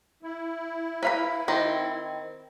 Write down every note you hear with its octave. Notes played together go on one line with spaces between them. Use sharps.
E4
B4 F5 B5
D#3 C4